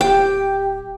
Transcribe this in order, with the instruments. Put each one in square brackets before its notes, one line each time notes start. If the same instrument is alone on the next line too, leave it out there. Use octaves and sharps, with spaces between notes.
[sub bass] D1 [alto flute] G4 [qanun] G5